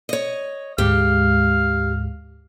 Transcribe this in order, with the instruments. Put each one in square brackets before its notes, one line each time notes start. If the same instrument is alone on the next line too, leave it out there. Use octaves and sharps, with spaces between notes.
[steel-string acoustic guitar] C#5 D#5
[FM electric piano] D2 G#2 G#3 [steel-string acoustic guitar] G4 [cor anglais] F5